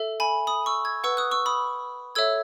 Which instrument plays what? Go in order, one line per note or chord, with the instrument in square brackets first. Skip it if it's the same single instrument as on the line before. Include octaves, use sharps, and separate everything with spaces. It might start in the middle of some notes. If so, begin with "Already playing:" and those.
Already playing: [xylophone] A4 E5
G#5 B5
B5 D#6
C#6 E6
E6 G#6
B4 F#5 C#6 E6
D#6 F#6
C#6 E6
B5 D#6
A4 C#5 E5 E6 G#6